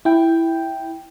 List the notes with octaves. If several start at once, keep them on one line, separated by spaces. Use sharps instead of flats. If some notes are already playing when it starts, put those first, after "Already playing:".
E4 G5